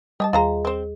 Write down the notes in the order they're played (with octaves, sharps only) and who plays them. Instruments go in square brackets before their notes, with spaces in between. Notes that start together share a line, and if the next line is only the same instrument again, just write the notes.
[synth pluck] G3 D#5 [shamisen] G4 G#5 A5
[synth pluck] D#2 G#4 [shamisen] F4 C5 A#5
[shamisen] C4 C5